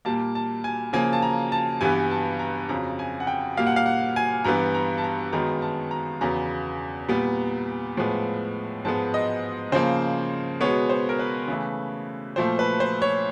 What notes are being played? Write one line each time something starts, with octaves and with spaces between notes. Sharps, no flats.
A#2 G3 A#3 A5
A5
G#5
C#3 F3 A#3 G#5
A5
A#5
A5
G2 E3 G3 B3 G#5
A5
A#5
F2 C#3 F#3 A#5
G#5
F#5
G5
A#2 G3 A#3 F5
F#5
F5
F#5
G#5
G2 E3 G3 B3 A#5
A#5
A5
A#5
F#2 D#3 G#3 B3 A#5
A5
A#5
E2 C#3 F#3 B3 A#5
A#2 G3 B3
A2 F3 G#3 B3
G#2 F3 G#3 B3 A5
D#5
C#3 F3 A#3 C5
B2 G#3 B3 C#5
C5
A#4
B4
C#3 E3 A3
A#2 F3 A3 C5
B4
C5
C#5